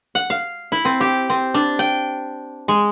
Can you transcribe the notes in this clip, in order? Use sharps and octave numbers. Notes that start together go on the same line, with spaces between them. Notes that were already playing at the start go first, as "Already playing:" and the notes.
F#5
F5
E4
C4
G4
C4
D4
G5
G#3